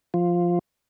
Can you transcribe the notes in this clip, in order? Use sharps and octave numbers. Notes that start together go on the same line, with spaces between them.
F3